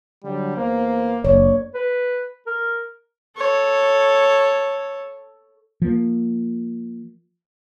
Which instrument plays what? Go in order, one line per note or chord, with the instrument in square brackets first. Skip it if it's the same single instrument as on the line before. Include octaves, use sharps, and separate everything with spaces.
[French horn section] D3 F#3 [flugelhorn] G3
[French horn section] E2 B3 C5 [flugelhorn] A#3
[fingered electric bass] F#1 [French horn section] D3 D5 [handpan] A#3 C#5
[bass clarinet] B4
A#4
[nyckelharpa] A4 C#5
[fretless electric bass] F3 A#3